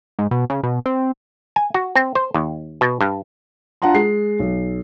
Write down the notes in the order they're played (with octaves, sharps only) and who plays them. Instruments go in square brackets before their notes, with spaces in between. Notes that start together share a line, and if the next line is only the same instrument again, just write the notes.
[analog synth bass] G#2
B2
C#3
B2
C4
[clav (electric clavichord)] G#5
F#4
C4
C5
D#2
B2
G2
[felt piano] D4 F4 F#5 A5 A#5 C6
G#3 C7
B1